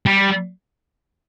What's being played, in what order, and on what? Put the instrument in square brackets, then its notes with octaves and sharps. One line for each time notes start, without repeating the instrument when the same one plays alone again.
[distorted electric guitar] G3